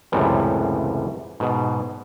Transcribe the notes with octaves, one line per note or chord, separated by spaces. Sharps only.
C#2 F#2 A2 C3 E3 G3
G#2 B2